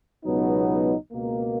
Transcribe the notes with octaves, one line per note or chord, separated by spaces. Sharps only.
C#2 B2 F#3 B3 D#4
C#2 B2 A#3